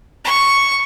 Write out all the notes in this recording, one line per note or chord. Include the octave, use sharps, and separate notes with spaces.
C#6